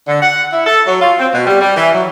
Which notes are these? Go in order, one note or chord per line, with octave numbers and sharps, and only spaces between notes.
D3
F#5
E4
A4
F#3
F4
C4
B2
G3
G3
E3
F#3